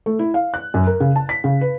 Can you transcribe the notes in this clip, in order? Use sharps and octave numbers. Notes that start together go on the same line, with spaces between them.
A3
E4
F5
F#6
F#2
A#4
C#3
A5
B6
C#3
B4